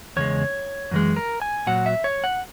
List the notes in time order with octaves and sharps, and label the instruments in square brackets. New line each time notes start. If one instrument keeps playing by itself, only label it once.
[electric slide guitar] E2 C#3 G#3 C#5
F#2 E3 G#3
A#4
G#5
A#2 F#3 F#5
E5
C#5
F#5